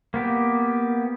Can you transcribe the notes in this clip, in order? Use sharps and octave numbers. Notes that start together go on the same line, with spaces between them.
A#3 B3 G4